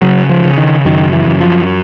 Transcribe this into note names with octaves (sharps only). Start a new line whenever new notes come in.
C#3 F#3
F3
C#3
D#3
F#2 D#3
E3
F#2
F3